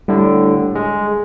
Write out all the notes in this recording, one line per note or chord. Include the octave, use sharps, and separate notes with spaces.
A2 D3 G3
G#3